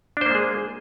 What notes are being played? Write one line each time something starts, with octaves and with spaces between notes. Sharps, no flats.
G#3 A#3 D4 G#4 C5